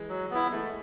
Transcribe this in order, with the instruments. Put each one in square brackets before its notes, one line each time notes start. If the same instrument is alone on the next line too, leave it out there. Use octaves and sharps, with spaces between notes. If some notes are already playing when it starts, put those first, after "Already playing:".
Already playing: [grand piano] E3 G#3
[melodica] F#3
B3 E4
[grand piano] E3 G#3 [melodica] A3